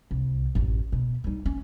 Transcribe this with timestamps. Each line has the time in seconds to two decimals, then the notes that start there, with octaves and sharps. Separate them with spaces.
0.11 C2
0.55 A1 F#2
0.92 B2
1.24 G3 D#4
1.46 C#4